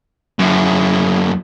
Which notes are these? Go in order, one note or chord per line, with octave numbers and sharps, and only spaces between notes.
F#2 E4